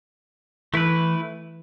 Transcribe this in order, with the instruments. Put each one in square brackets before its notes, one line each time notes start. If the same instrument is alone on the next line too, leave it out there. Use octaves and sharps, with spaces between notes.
[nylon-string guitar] E3 [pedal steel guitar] A3 E4 B4